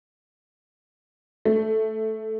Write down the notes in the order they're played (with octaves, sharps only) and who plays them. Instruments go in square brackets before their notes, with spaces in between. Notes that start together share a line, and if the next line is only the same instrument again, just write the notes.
[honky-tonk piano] A3